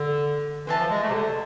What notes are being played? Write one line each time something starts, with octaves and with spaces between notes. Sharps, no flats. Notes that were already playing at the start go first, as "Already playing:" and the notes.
Already playing: D3
E3 C5 E5 A5
F3
G#3
A3
C3
D3